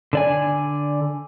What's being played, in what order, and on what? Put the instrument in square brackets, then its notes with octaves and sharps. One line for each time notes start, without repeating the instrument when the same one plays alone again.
[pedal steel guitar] D3 D5 G#5